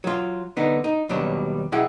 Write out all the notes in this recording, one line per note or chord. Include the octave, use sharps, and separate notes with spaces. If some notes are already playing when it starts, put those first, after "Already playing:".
F#3 F4
D3 B3 D#4
D#4
D#2 B2 F#3 G3 D4
B1 E4 G#4 F#5 G5